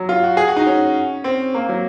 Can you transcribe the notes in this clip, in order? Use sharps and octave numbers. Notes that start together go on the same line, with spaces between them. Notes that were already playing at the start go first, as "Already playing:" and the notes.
Already playing: F#3
F4
F#4
G#4
F#4
D#4
C#4
C4
A#3
F#3